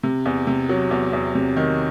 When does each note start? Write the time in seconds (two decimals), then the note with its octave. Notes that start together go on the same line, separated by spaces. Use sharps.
0.03 C3
0.26 E2
0.47 C3
0.69 F#3
0.91 E2
1.13 E2
1.35 C3
1.56 D#3